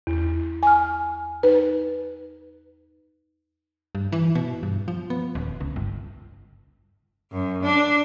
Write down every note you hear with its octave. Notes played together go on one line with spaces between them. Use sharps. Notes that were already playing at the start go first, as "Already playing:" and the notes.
E2
G#5 F6
D#4 B4
G2
E3
B2
G2
F3
B3
D#1
C#2
G1
F#2
D4